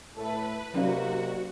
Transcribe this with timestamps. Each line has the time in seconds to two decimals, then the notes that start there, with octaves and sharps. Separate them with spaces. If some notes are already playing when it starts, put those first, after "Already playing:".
0.16 A2 A3 A4 B4
0.74 C3 F#3 A#3 C#4 D#4 F#4 D5